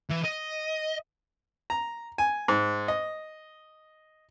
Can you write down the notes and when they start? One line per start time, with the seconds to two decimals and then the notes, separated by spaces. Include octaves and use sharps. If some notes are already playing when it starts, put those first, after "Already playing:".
0.11 E3
0.25 D#5
1.70 A#5
2.18 G#5
2.48 G#2
2.88 D#5